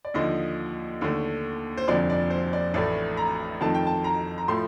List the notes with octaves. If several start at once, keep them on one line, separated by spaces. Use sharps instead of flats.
D5
D#2 D3 F3 D#5
D#2 D3 A3
C5
F1 F2 D3 D5
D5
C5
D5
A1 A2 A3 D5
A#5
F2 D#3 A3 A5
G5
A5
A#5
A#5
A2 F3 A3 C6